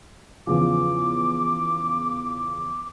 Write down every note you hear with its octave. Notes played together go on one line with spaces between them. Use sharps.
E2 C#3 F3 D6